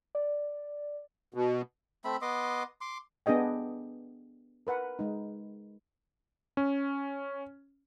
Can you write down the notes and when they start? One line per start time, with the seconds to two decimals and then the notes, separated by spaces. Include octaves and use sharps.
0.15 D5
1.34 B2
2.05 A3 C4 E5 B5
2.22 B3 D#5 C6 D6
2.81 C6 D6
3.26 B3 D4 G#4 D#5 G5
4.67 A#4 B4 F#5
4.99 G#3 D#4
6.57 C#4